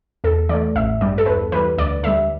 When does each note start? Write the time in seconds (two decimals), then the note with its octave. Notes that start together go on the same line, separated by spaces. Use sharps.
0.24 E2 A4
0.49 E3 A3 D5
0.75 A1 E5
1.01 G2 G3 D5
1.18 A4
1.26 E2 B4
1.52 E3 G3 B4
1.78 D2 D5
2.03 D3 G3 E5